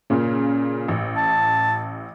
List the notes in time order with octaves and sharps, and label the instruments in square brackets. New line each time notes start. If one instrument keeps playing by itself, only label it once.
[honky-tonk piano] A#2 C#3
A1
[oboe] A5